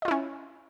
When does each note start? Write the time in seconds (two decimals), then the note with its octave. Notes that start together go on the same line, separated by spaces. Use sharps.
0.02 D#5
0.05 F4
0.08 E4
0.11 C#4